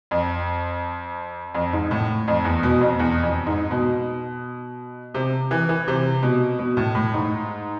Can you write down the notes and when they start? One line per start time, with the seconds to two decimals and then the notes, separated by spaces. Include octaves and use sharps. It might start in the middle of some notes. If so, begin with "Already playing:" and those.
0.11 F2
1.55 F2
1.73 G#2
1.91 A2
2.28 F2
2.45 E2
2.63 B2
2.81 F2
2.99 E2
3.23 F2
3.47 G#2
3.71 B2
5.14 C3
5.51 E3
5.69 E3
5.88 C3
6.23 B2
6.59 B2
6.77 A2
6.95 A2
7.14 G#2